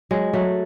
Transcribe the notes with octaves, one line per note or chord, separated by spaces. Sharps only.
F#3 G#3
F#3 A3